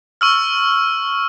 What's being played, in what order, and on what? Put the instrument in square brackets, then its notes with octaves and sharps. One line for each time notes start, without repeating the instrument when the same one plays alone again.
[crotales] C#6 E6 F6